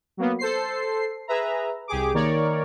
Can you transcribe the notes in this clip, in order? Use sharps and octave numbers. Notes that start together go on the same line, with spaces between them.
F#3 A#3 B3
A4 C5 C7
G#4 B4 E5 A#5
C2 G4 G#4 D6
D#3 A#3 A#4 C#5 D5